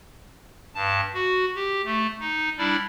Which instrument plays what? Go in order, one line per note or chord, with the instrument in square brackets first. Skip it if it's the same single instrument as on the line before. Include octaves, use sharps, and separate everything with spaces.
[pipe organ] G2 A5
F#4
G4
A3
D#4
G3 D4 E4 D5